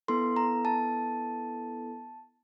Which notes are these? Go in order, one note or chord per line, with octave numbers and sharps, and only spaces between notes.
B3 E4 A4 C6
A#5
A5